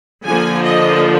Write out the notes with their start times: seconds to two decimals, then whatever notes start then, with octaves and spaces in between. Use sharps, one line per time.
0.25 D3 F3 A#3 G#5
0.64 D#5